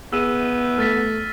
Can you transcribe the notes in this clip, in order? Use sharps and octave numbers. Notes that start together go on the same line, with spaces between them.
B3 G#4 E6 D#7
A3 F6 A6 B6